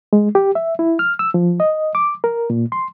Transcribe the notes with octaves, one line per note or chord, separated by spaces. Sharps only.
G#3
G4
E5
E4
F6
E6
F3
D#5
D6
A#4
A#2
C6